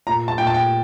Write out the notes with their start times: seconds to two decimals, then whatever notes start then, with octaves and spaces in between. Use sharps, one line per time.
0.07 A#2 A#5
0.28 A5
0.38 A#2 G5
0.47 A5
0.54 G5